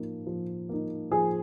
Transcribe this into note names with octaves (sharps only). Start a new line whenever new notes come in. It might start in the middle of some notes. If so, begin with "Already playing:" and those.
Already playing: F3 A#3 D#4
F3
A#3 D#4
F3 G#4